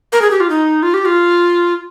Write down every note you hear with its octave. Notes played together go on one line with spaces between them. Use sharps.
A#4
G#4
G4
F4
D#4
F4
G4
F4